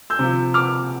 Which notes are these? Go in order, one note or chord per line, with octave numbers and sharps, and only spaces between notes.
E6 G6
C3 F3
D6 F6